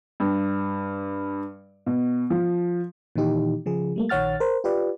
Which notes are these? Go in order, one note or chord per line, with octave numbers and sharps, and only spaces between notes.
G2
B2
F3
A#2 D#3 E3 D#4 G4
C#3 F3 G#4
G3 A3 A#3
A#1 D#3 C#5 F#5 F6 A6
A#4 C5
F4 G4 B4 D5